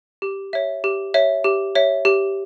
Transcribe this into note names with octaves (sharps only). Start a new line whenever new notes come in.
G4
C#5 E5
G4
C#5 E5
G4
C#5 E5
G4